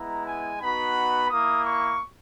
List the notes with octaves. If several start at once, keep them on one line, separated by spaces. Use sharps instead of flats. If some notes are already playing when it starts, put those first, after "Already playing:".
Already playing: G#3 B3 E4 A#5
G#5
B3 D#4 F#4 B5
A#3 E4 D#6
C#6